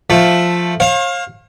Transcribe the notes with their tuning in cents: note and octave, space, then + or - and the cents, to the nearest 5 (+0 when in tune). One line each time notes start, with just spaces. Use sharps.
F3 +0 A3 +0
C#5 -45 F5 +15